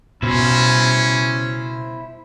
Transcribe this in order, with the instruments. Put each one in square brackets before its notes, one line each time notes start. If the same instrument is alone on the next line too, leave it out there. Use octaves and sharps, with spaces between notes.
[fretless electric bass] B2 [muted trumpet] C#4 [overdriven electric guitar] E4 C5